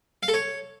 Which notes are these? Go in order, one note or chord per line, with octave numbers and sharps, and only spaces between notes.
F5
A4
C#5